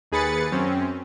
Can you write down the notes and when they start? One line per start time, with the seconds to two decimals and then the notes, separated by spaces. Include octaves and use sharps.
0.12 D#2 G#4 B4 A6 C#7
0.52 F#2 C4 C#4